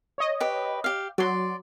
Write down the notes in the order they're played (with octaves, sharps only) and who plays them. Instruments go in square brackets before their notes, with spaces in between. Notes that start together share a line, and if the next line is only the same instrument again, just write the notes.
[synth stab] C#5 D#5
[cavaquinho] G4 B4
G4 F5
[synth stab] F#3 [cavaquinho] D5 C6